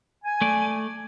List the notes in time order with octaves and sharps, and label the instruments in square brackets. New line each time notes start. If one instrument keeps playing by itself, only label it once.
[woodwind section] G#5
[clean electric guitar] A3 D5